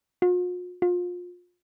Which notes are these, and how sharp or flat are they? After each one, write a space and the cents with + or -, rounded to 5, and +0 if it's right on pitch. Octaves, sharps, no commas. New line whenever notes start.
F4 +45
F4 +30